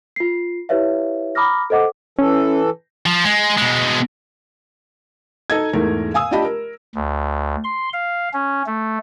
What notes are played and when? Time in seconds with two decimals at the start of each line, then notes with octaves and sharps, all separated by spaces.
0.16 F4 C7
0.69 E4 G4 B4 C#5 E5 F5
1.35 A#5 B5 D6 D#6 F6 A#6
1.70 A4 C5 D#5 F#5 D6
2.19 E3 C#4 A4
3.06 F3
3.24 G#3
3.57 B2 G#3
5.50 D#4 A4 D#5 G#6
5.73 E2 G#2 A3 A#4
6.14 F5 G#5 D#6 E6
6.31 D4 F4 G4 D#5 A5 B5
6.45 A#4
6.95 D2
7.64 C6
7.93 F5
8.33 C#4
8.67 A3